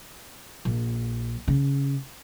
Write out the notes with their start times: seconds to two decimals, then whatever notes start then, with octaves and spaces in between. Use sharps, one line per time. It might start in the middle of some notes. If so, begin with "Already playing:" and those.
0.65 A#1
1.48 C#3